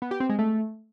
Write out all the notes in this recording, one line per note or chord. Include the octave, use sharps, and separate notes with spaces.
B3
G4
C4
G#3
A3